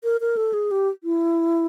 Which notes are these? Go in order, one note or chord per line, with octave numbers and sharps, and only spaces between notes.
A#4
A#4
A4
G#4
G4
E4